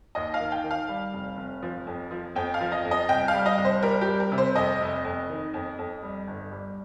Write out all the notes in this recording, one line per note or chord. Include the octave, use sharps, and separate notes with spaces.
D#2 D#5
F5
D#3
G5
D#3
F5
G3
F1
F1
F3
F2
F3
F2 G5
F5
F3
D#5
F2
D#5
C2 G5
F5
G3
D#5
C2
C5
G3 A#4
G4
G3
A#4
C3
C5
F2 D#5
F1
F2
D#3
F2
F2
G3
G1
G3